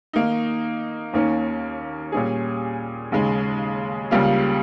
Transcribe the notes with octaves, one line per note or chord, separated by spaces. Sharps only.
D#3 A#3 D#4
D#2 D#3 A#3 C#4
A#2 G3 C#4 G#4
D#2 C#3 G#3
C#2 C#3 G3 A#3 F4